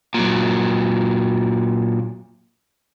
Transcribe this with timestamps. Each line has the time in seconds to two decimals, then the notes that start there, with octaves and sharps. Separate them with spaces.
0.14 A#2 F#3